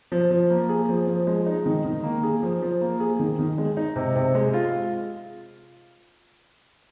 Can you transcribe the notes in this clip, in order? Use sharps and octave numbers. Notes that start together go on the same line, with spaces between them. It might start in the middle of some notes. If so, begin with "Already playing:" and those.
F3
F3
A#3
G#4
F3
F3
G#3
D#4
D#3
D#3
A#3
G#4
F3
F3
A#3
G#4
D#3
D#3
G#3
D#4
C3
C3
G#3
F4